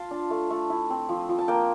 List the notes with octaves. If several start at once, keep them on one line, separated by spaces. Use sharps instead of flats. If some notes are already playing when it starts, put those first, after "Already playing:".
Already playing: F4 A5 C6
D4
A3
A3
E4
C4
F3
F3
A5
A#3 G5 A#5